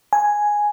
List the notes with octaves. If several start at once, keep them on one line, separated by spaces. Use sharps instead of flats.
G#5